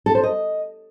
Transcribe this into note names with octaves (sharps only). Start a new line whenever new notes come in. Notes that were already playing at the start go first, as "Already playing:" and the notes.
A4
C5
D#5